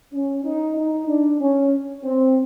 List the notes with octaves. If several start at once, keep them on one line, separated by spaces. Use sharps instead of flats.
C#4
D#4
D#4
D4
C#4
C4